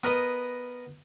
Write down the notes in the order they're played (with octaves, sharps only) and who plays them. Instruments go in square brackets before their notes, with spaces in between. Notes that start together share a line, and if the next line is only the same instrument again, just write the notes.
[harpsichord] B3 A#4 B4 D#5